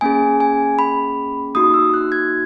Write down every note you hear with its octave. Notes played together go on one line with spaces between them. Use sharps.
A#3 C#4 G#4 G#5
G#5
B5
A#3 D#4 F#4 D#6
E6
F#6
G#6